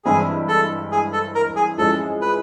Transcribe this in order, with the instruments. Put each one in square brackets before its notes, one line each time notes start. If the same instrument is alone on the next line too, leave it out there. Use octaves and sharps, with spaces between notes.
[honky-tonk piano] G2 E3 G#3 C4 E4 [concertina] G#4
[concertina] A4
G#4
A4
A#4
G#4
[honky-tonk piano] F3 G#3 C#4 E4 G#4 [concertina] A4
[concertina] B4